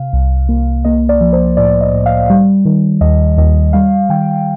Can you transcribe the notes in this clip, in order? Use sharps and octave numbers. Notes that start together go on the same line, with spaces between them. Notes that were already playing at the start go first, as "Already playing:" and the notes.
Already playing: C3 F5
C2
A#3
A#3 D#5
D5
F3
C5
A2 D5
D#5
A2
F5
G3
D#3
D#2 D#5
D#2 D#5
G3 F5
D#3 G5